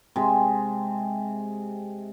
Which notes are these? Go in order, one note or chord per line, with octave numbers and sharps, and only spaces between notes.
C3 G#3